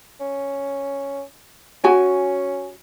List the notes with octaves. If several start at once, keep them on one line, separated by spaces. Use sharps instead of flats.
C#4
C#4 F#4 G#5